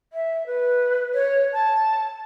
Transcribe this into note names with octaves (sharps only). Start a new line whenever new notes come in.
E5
B4
C#5
A5